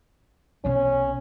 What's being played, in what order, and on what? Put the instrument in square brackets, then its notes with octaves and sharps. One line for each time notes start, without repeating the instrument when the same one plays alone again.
[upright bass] B1 C3 [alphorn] C#4